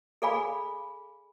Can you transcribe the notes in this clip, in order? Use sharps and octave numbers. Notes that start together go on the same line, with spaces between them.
G#4 A4 D5 F5 G#5 B5